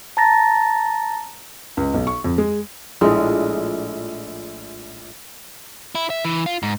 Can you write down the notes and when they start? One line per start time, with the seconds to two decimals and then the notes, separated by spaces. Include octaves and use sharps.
0.17 A5 A#5 A6 A#6
1.77 C#2
1.94 B1
2.07 C#6
2.24 F2
2.38 G#3
3.01 A#1 A2 G#3
5.95 E4
6.10 E5
6.24 E3
6.46 F4
6.63 G#2